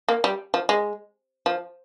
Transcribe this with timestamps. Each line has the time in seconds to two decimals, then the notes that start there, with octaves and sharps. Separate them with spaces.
0.09 A#3
0.24 G3
0.54 F3
0.69 G#3
1.46 F3